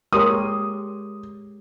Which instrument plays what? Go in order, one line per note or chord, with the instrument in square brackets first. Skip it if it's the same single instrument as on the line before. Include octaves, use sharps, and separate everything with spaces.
[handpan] G#3 G4 C#5 [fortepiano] A#4 C6 [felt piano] D#6